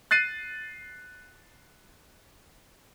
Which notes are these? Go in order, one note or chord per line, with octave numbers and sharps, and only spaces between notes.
F#6 A6 C7 D#7